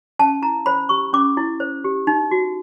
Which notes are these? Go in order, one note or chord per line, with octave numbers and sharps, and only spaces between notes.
C#4 A5
E4 A#5
C5 B5
G4 C#6
C#4 D6
E4
C5
G4
D#4
F#4